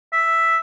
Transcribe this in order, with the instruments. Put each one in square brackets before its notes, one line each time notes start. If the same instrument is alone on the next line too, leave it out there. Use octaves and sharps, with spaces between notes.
[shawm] E5